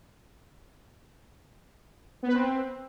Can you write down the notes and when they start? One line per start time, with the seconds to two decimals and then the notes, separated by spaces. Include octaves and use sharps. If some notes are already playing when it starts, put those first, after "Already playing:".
2.23 B3
2.28 B4
2.34 C4